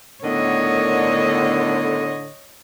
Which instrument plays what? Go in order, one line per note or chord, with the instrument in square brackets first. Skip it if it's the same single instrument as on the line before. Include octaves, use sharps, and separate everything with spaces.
[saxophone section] A2 D3 [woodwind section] D#3 B3 [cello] C#5 D#5